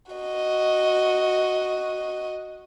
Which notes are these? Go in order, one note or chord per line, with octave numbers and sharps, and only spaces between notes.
F#4 D#5